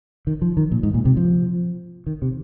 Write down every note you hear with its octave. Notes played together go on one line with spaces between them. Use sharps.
D#3
F3
D#3
A#2
G#2
A#2
C3
F3
D#3
C3